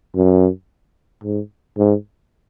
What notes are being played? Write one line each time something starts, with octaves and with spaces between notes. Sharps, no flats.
F#2
G#2
G#2